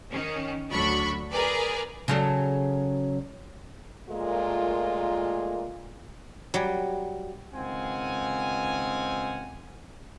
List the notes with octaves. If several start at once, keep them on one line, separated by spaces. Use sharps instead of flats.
D#3 C#4
D2 F#3 D4 B5 C#6
G#4 A#4 B4 D5
C#3 F#3 A4
A#2 G#3 A3 F4 A#4
F#3 G3
C#2 D#3 C4 F5 F#5 G#5